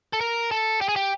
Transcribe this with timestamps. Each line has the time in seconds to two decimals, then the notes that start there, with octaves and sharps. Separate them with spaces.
0.13 A4
0.21 A#4
0.52 A4
0.81 G4
0.89 G#4
0.96 G4